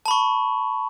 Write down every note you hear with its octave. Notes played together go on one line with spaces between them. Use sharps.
A5 B5 C#6